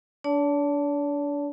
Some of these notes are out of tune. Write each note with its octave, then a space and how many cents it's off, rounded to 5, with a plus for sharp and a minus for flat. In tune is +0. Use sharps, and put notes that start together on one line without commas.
D4 -25 D5 -45 A5 +0